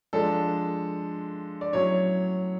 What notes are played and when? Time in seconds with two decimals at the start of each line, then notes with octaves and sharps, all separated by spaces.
0.13 F3 G#3 D4 A4
1.61 D5
1.73 A2 F#3 C#4 C#5